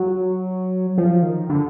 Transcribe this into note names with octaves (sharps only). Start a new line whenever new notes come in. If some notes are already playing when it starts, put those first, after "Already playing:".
Already playing: F#3
F3
D#3
D3